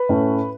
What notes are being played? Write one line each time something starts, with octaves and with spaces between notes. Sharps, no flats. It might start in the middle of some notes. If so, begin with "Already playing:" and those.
Already playing: B4 B5
A2 A3 C#4 E4